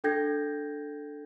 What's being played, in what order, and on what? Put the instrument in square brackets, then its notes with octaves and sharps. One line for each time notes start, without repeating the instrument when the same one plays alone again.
[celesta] D4 A4 G5 G6 G#6 A#6